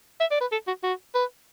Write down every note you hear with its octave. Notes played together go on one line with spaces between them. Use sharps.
E5
D5
B4
A4
F#4
F#4
B4